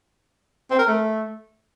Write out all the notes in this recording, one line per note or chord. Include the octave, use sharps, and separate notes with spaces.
C4
A#4
A3